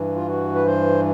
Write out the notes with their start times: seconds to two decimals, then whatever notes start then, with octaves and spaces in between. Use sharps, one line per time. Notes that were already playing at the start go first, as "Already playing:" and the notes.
Already playing: G2 E3
0.15 F4
0.28 F#4
0.55 B4
0.66 C5